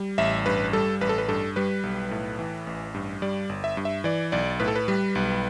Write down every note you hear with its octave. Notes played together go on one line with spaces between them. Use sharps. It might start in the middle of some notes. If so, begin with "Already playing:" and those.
Already playing: G3
A1 E5
G2 B4
G3 A4
A1 B4
A4
B4
G2 A4
G3 B4
B1
A2
E3
A1
G2
G3 D5
G1
E5
G2
E5
E3 D5
B1 D5
A2 B4
A4
B4
G3
B1